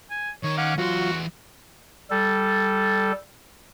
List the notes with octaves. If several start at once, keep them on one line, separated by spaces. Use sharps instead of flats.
G#5
D#3 C#5
C#4 F5 F#5 D6
E2 F#3 F4 F#4 C6
G3 A4